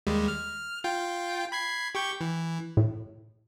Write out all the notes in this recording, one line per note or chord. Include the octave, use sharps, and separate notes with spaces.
D#2 G3 G#3
F6
F4 G5
B5 G#6 C7
G4 C#6 G6
E3
A2